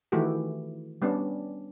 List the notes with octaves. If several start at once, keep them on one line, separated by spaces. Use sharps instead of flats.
D#3 E3 A3 E4 F#4 G4
G3 B3 C#4 D4